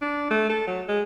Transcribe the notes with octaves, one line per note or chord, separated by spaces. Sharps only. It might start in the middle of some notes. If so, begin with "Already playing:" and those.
D4
A3
A4
F#3
G#3